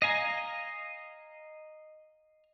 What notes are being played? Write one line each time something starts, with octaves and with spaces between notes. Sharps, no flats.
D#5 F5 G#5 A#5